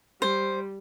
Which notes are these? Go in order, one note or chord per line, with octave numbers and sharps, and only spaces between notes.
G3 C5